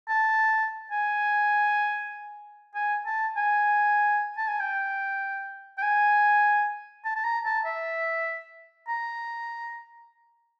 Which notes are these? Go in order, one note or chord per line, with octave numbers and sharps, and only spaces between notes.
A5
G#5
G#5
A5
G#5
A5
G#5
G5
G5
G#5
A5
A5
A#5
A5
E5
A#5